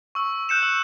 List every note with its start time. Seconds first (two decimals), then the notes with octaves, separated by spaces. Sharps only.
0.15 C#6 E6
0.49 F#6 G6 C#7 E7
0.63 E6